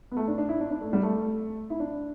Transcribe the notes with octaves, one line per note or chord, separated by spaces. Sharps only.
B3
A3
D4
D4
E4
D4
D4
A3
G3
A3
E4
D4